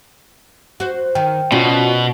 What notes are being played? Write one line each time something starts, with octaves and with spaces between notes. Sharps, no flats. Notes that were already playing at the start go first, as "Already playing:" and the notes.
F#4 C5
D#3 G5
B2 C#4 F4 F#4 D5